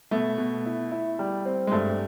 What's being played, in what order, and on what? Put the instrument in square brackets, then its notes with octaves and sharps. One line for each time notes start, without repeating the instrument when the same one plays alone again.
[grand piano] B2 [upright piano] A3
[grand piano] B2
E4
E4
G3
C4
[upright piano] G#3
[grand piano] G2 [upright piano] A3